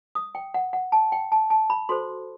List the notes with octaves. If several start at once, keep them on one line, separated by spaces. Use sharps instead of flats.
D#6
G5
F#5
F#5
A5
G5
A5
A5
B5
F#4 A4 C5 C6